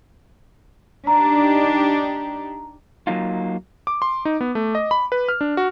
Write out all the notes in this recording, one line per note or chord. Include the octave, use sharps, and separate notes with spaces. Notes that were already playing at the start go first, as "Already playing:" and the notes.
D4 D#4 G4 A#5
F#3 A#3 D#4 F4
D6
C6
D#4
B3
A3
D#5
B5
B4
F6
D4
F#4